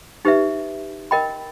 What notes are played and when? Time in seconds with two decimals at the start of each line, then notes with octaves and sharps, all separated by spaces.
0.25 D#4 G4 B4 E5
1.11 A#4 D#5 G5 B5